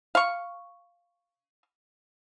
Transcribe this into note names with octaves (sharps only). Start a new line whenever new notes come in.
F5 C#6